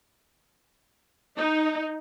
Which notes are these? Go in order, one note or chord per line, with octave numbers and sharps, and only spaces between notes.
D#4